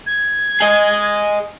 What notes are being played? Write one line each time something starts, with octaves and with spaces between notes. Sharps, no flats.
G#6
G#4 D#5